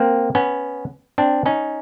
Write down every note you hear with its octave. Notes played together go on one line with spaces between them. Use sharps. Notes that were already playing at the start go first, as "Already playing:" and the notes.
Already playing: A#3 C4
B3 C#4
C4 D4
C#4 D#4